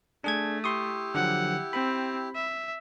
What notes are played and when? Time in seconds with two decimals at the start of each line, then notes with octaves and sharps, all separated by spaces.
0.24 A3 D4 G#4 G#6
0.64 E4 G4 C6 C#6 D#6
1.15 D3 F3 F#3 F#5
1.73 C4 B5
2.35 E5